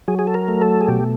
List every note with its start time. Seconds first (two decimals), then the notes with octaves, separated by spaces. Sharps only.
0.08 F#3 G#4
0.19 G#4
0.27 A4
0.34 A#4
0.48 A3
0.62 A4
0.81 G#4
0.88 B2 G4